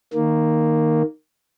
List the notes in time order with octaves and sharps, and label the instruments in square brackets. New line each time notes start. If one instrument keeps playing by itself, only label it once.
[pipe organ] D#3 A#3